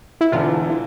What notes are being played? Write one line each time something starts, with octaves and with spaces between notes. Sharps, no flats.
E4
E1 E2 D3 F4
E3